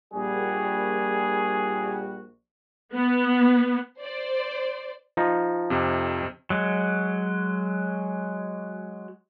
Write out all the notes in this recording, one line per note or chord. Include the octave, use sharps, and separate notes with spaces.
A#1 G3 F#4 G#4
B3
C5 D5
F3 D#4
F2 C3
F#3 G#3